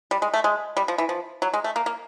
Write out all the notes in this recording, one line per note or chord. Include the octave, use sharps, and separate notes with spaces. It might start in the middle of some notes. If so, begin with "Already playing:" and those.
G3
G#3
A3
G#3
G3
F3
E3
F3
F#3
G#3
A3
A#3
A#3